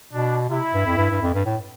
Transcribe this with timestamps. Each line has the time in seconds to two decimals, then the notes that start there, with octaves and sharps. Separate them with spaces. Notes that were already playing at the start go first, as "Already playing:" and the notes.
0.13 B2 D4
0.49 C3 E4
0.74 G2
0.86 F2
0.97 G2
1.10 G2
1.22 F2
1.34 G2
1.45 A2